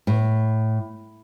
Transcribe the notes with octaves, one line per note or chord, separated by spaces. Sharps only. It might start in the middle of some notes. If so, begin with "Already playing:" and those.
A2